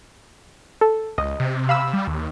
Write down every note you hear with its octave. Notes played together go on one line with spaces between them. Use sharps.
A4
C#2 D#5
C3
F5 B5 E6
G3
D#2